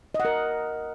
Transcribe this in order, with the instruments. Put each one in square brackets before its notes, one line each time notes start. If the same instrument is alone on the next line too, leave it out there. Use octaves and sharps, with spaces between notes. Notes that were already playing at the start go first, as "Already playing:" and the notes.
[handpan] D#5
F#5
A#4